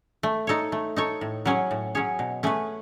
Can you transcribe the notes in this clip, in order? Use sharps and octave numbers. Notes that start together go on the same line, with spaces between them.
A3
D#4 A4 C#5
A3
D#4 A4 C#5
A2
F#3 C#4 G#4 C#5
A2
F#3 C#4 G#4 C#5
B2
A3 C#4 G#4 B4